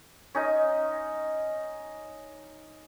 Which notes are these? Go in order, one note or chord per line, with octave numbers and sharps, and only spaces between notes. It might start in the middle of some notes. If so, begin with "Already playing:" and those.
C#4 D#4 D#5